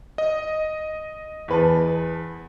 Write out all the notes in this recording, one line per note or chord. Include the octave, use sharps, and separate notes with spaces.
D#5
E2 B4 A5